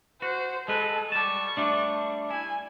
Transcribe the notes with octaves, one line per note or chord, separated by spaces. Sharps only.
F#4 C5
G#3 A4 B4
G3 A5 C#6
G3 A3 D4
E4 G#5